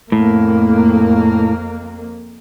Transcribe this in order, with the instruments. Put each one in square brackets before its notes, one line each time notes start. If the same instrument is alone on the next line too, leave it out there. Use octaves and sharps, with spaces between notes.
[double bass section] F2 A#3 [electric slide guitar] A2